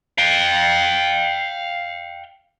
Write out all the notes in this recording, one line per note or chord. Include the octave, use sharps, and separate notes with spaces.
F5 G5